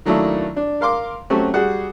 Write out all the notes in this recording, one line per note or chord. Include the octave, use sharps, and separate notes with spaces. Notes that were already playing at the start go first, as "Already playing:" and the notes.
D#3 F#3 A3 A#3 D4 E4
D4
A#4 F5 C6 D6
F#3 A3 C4 C#4 F#4 G4
G3 F#4 G#4 F#5